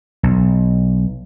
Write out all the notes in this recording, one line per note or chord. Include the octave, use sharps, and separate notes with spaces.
B1